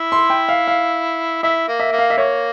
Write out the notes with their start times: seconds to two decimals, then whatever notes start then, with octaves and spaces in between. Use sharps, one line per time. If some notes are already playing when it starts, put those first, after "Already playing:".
Already playing: E4
0.12 C6
0.30 G5
0.49 F5
0.67 F5
1.43 E4 E5
1.68 A#3
1.80 E5
1.92 A#3
1.98 F5
2.10 E5
2.18 A#3 C#5